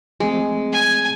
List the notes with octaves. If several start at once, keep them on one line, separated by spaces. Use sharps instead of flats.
F3 G#3 A3 C4
G#5